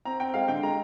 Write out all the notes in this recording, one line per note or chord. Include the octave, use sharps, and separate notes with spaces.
C4 A#5
C4 G5
G#3 F5
D3 G5
G#3 A#5